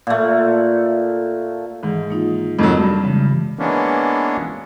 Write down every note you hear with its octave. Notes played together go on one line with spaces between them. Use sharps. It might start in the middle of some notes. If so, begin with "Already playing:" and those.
A#2 A3
G#2 D#3 E3
A#3 D#4 F4
F2 D#3 F#3
G2
C#3 E3 G#3
E3 G#3 A#3 B3 C#4 D4